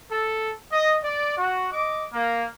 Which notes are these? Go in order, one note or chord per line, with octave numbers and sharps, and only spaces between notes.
A4
D#5
D5
F#4
D#5 D6
A#3